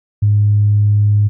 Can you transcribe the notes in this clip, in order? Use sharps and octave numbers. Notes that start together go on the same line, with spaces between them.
G#2